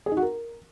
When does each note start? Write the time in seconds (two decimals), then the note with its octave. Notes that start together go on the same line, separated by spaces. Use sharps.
0.06 G#4
0.12 D#4
0.17 F#4
0.22 A#4